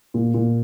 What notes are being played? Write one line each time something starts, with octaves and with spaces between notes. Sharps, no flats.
A#2
A#2